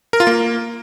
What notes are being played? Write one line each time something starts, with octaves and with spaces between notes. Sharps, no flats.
A#4
F4
A#3